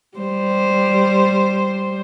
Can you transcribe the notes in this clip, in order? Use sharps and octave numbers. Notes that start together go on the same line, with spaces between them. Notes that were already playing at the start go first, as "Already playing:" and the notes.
G3 C5